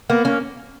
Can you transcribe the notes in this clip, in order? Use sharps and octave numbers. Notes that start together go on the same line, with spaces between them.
A#3 B3
A#3 C#4